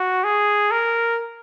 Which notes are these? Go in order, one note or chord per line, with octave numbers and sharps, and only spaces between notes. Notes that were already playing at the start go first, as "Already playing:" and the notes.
Already playing: F#4
G#4
A#4